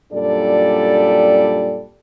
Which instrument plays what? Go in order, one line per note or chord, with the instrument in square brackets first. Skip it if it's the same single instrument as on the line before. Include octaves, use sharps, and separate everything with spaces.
[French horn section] F#2 A#2 G3 D4 A4 D5